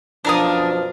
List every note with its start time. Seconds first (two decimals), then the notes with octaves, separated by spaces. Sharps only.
0.25 F#2 B2 F3 D4 A#4 D#6